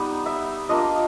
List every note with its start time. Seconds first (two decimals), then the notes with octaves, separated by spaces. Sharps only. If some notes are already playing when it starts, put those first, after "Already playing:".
Already playing: G3 B3 D#4 F#5
0.26 E5
0.69 A#3 D4 F4 D#5